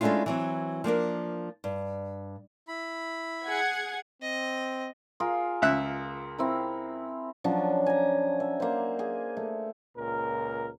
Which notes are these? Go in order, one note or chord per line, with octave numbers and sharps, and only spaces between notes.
G#3 A3 C#4 D4 E4 F4
E3 F#3 C4
F3 A#3 D4 A#4
G2
E4 B5
G#4 F#5 G#6
C4 D#5
F4 G#4 A#4
C#2 E5 F#6
C4 E4 A#4
F3 F#3 C#4 D4
G#5 A#5
E5
A#3 C5
G#4 G#5
A3
C#2 A#2 A#4